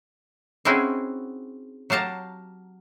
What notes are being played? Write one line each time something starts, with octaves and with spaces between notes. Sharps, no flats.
C4 C#4 D#4 E4 F#4 G#4
F#3 G4 F5 A5 A#5